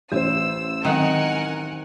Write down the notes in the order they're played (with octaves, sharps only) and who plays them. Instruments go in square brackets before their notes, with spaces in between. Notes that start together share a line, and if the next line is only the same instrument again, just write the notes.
[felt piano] A1 C5 [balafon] A3 [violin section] E6
[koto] D#3 [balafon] F#3 G#3 C4 [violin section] A#4 F#5 G#5